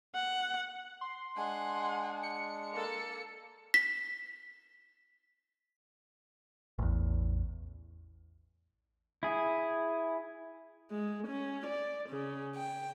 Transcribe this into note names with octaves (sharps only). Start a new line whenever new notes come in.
F#5
C6
G#3 D4 F#5 G#5
C#7
A#3 A4
B6
A1 E2
E4 G#4
G#3
C#4
D5
C#3
G5